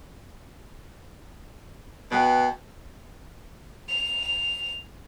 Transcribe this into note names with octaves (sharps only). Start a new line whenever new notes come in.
B2 G#4 B4 G5
F7